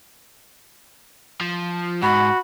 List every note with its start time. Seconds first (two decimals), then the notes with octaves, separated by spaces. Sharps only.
1.41 F3
2.02 G#2 F#4 B5